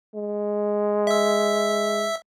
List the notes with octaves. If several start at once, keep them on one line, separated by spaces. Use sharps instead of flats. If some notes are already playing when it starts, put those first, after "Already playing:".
G#3
E5 E6